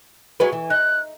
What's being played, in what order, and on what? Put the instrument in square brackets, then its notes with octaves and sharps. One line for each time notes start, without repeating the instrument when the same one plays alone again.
[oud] F#3 G#3 B4
E3
[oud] D#4 [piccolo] F#6